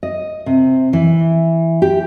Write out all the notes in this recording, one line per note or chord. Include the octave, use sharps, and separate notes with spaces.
D#5
C3
E3
G4